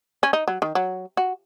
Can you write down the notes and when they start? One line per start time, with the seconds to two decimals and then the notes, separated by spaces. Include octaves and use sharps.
0.23 C#4
0.33 D#4
0.48 F#3
0.62 D#3
0.75 F#3
1.17 F#4